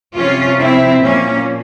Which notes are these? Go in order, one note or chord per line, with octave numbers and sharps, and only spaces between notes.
C3 F3 C#4 F4
C4 E4
A#2 F3 A#3 C#4